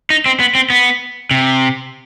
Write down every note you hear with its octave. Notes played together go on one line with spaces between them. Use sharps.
D#4
C4
B3
C4
B3
C3